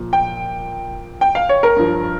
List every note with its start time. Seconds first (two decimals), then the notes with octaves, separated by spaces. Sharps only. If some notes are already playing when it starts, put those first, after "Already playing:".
Already playing: A#2 F3
0.13 G5
1.21 G5
1.35 F5
1.49 C#5
1.63 A#4
1.76 G2 F3